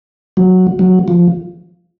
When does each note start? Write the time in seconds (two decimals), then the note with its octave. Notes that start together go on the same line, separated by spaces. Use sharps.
0.37 F#3
0.79 F#3
1.08 F3